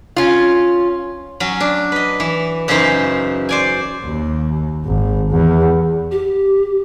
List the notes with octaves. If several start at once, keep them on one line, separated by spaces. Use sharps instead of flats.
C#4 F4
F#3 C#4
D4
B4 D#5
E3
F#2 C#3 E3 D#4 C5 B5
C5 D5 G#5
D#2
G#1
E2
G4